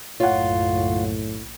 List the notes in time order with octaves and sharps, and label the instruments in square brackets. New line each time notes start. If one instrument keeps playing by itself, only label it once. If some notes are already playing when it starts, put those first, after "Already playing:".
[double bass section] F#1 B1 [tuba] A2 [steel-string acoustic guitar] F4 [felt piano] C#5 F#5